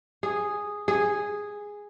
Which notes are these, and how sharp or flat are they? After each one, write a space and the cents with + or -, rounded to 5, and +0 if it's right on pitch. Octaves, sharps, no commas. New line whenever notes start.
G#4 -5
G#4 -5